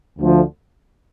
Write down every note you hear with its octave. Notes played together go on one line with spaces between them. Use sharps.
D2 D3 F3